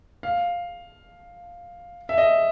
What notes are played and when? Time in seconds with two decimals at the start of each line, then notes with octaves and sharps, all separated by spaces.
0.23 F5
2.09 E5
2.18 D#5